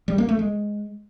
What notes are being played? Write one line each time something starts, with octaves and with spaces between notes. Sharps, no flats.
G3
A#3
A3
G#3